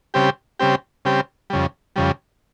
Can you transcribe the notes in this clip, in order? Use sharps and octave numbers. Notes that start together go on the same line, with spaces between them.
C#3 G3 C4 G4
C#3 G3 C4 G4
C#3 G3 C4 G4
F2 C#3 G3
F2 C#3 G3